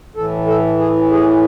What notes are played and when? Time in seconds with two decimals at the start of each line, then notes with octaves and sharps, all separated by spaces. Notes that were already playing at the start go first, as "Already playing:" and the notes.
0.15 A2 E3 A4
0.47 A4
0.79 G#4
1.11 G#4